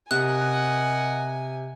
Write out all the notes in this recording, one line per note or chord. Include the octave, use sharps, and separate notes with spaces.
C3 A#4 D#5 F#5 G#5 F#6